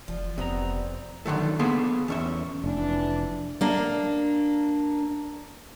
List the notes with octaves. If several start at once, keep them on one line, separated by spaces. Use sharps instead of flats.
F1 F3 D5
F1 F2 C3 B3 C4 A#5
D3 D#3 F#3 A3
A#3 B3 G#4 A4 C5
E2 C#4 E5
F1 E3 D4
A#3 D4